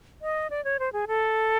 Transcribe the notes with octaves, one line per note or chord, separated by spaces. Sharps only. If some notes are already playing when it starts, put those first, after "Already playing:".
D#5
D5
C#5
C5
G#4
A4